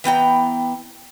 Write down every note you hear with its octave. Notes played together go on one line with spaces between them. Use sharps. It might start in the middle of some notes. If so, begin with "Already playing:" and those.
E3 B3 G5 A#5